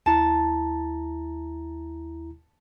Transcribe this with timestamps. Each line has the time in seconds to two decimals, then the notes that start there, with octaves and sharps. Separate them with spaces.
0.06 D#2 E4 A5 A#5